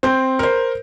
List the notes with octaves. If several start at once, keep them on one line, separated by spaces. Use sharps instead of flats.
C4 G6
A#4 C5